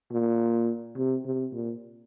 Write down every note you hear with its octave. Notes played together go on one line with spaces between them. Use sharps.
A#2
C3
C3
A#2